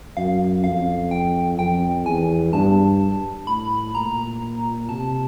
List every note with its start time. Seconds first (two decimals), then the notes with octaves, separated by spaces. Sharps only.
0.17 F#2 F5
0.64 F2 F5
1.11 G5
1.59 F2 G5
2.05 E2 G#5
2.53 G2 A5
3.47 A2 B5
3.95 A#2 A#5
4.89 C3 A5